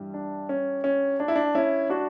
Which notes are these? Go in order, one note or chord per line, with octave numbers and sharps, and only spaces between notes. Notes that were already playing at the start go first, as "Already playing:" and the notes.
Already playing: G2 E3 G3
D4
C#4
C#4
D4
E4
D4
C#4 E4
D4 F#4